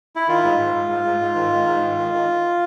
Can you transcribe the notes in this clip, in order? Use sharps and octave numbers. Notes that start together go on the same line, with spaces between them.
E4
D#3 F4
G#2
G#2
G#2
G#2
G#2
G#2
D#3
D#3
G#2
D#3
D#3
D#3